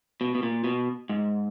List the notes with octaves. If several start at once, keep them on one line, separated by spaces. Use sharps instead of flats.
B2
B2
A#2
B2
G#2